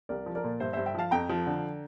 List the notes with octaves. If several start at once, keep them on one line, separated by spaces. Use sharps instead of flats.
C2 A#4 D5
F3
A#4 D5
A#2
G2 C5 E5
G2 C5 E5
E5 G5
F3 F5 A5
F2 G5 A#5
F3
D3